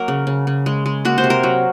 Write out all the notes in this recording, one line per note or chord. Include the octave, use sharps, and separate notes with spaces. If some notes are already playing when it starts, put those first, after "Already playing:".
Already playing: F#3 A#3 A#4
C#3
C#3
C#3
G#3
G#3
A#3 F#4
C5
C3
A#4
F#3